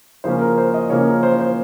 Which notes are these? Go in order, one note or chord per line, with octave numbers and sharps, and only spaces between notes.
C#3 F3 A#3 C#4 C5
A#4
C5
D#5
C#3 F3 A#3 C#4 C#5
A#4
C5
C5